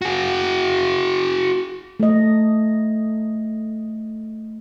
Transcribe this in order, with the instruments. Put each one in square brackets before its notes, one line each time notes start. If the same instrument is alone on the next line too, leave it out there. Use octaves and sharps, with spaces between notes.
[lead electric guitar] F#4 G#4
[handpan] A3 D#5